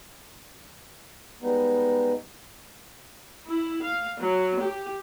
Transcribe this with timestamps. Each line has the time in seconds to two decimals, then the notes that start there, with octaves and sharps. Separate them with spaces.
1.41 G3 G#3 B3 D#4
3.47 E4
3.83 F5
4.21 F#3
4.61 G4